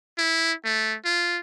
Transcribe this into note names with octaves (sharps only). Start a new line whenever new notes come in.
E4
A3
F4